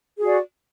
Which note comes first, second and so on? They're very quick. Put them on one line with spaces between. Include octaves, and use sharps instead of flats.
G#4 F#4 D5